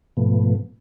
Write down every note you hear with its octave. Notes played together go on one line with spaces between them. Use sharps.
G#2 B2 F3 A3 B3